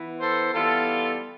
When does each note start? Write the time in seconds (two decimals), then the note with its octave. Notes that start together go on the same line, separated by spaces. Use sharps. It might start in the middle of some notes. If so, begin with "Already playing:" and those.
Already playing: E3 B3
0.20 A4 C5
0.53 E3 G3 B3 F4 A4